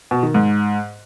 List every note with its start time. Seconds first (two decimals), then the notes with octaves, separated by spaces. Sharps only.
0.11 B2
0.23 D#3
0.34 G#2